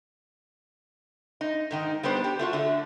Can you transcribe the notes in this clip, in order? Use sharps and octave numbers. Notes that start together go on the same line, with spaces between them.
D#4
G#2 D#3 D#4
G3 B3 D4 C5
G4
A3 F4 F#4
D3 A3